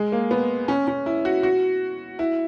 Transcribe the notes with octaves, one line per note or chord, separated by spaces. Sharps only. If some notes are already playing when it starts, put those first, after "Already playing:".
Already playing: G#3
A#3
B3
C#4
C#4
E4
F#4
F#4
E4